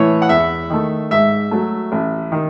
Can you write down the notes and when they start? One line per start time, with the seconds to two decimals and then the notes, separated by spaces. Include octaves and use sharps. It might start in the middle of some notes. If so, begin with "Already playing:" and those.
Already playing: A2 E3 C#5
0.22 F#5
0.29 E2 E5
0.70 D#3 A3
1.11 G#2 E5
1.51 F#3 A3
1.92 A1
2.32 D#3